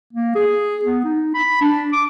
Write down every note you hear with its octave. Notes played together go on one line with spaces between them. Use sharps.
A#3
G#4
B3
D#4
B5
D4
D6